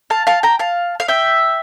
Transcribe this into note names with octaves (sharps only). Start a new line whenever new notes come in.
F5 A5
F5 A5
G5 A#5
F5 A5
F5
E5 G5